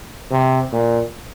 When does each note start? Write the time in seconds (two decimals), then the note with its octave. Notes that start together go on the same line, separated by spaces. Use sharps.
0.31 C3
0.72 A#2